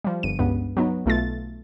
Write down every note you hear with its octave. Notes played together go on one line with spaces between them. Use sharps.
F3 G3
G1 D#7
C#2 G2 B3
F#3 B3 D#4
B1 A3 F4 A6